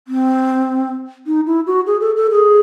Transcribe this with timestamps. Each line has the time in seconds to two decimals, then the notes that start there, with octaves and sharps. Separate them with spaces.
0.08 C4
1.27 D#4
1.46 E4
1.67 F#4
1.87 G#4
2.01 A4
2.16 A4
2.31 G#4